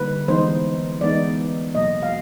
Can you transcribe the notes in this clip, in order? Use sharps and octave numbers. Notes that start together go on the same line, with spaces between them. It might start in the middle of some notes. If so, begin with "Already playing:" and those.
Already playing: D3 G3 A#3 D#4 B4
E3 G#3 B3 D#4 C5
E3 G#3 B3 D#4 D5
B2 F#3 A#3 D#5
F5